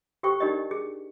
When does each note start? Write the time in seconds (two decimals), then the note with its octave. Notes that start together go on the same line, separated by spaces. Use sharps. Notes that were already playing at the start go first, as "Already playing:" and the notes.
0.23 G4 A4 C5 G5 C#6
0.40 D4 D#4 G4 A#4 D5 D#5
0.71 G#4